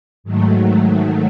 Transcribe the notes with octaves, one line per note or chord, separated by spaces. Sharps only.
G#2 D#3 F#3 A3